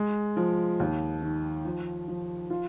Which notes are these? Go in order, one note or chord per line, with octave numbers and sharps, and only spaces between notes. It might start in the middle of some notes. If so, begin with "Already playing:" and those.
Already playing: G#3
F3
D#2
D#3
F3
F3
F4